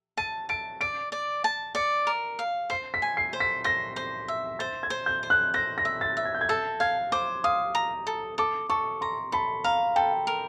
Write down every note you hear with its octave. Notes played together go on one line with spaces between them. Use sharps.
A5 D#7
A5 D7
D5 D7
D5
A5
D5 C#7
A#4
F5
C5 C7
B6
G#5
C7
C5
B6
C5 A#6
C5
E5
C5 A6
G#6
C5
G6
C5
F#6
C5 A#6
A#6
E5
A6
E5
G#6
G6
G#6
A4 A6
F5 G#6
C5 D6
F5 D#6
A#5
A4
A4 D6
A4 C#6
A#5 C6
A4 B5
F5 A#5
A4 G5
A#4